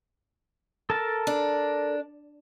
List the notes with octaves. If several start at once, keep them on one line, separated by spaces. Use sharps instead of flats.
A4 A#4 A5
D4